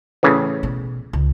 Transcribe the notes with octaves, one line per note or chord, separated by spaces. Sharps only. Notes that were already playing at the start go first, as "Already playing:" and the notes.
A2 C#3 E3
B2
C#2